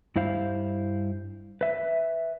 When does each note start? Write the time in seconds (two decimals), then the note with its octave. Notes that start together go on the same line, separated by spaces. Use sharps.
0.16 G2 E4 C5 F5
1.61 B4 E5